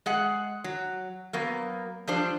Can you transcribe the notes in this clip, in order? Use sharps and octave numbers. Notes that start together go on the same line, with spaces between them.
G#3 G#4 F#5
F#3
F#3 A#3 B3
F3 G3 D4 C5